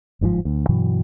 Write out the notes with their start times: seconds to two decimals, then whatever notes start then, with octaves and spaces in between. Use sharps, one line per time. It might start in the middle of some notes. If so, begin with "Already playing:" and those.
0.21 G1 G#2 D3 F3
0.45 D2
0.69 G2 B2 E3 F#3